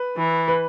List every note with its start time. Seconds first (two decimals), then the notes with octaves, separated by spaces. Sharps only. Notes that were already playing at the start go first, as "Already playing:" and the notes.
Already playing: B4
0.17 E3
0.48 B4